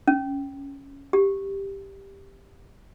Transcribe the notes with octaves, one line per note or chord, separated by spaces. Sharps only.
C#4
G4